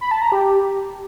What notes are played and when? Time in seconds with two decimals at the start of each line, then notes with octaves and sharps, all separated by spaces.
0.01 B5
0.11 A5
0.22 A#5
0.32 G4